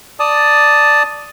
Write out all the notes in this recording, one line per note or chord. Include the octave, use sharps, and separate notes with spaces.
D5 A5 D#6